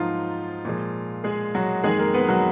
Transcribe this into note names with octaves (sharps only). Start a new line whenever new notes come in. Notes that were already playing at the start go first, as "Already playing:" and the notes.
Already playing: G#2 F3 F#3 A#3 D#4 F4
A#2 F3 G#3
G#3 G#4
F#3 F#4
F2 D#3 G#3 A#3 G#4
A#3 A#4
B3 B4
F#3 F#4